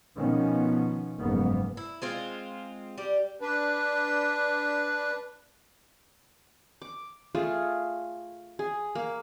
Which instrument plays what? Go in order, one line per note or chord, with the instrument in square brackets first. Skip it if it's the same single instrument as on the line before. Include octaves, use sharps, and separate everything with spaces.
[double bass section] B2 D#3 F3 B3 C#4
F#1 F2 G#2 A#3 B3
[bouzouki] E4
G#3 C4 F4
G3 G4
[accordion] D4 B4
[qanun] D6
A3 F4 G#4 A5
G#4
A#3